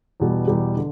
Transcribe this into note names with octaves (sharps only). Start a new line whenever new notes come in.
E2 B2 G3
E2 B2 G3
D3